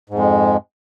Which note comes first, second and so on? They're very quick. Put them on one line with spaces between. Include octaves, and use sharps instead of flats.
G#2 F2 G#3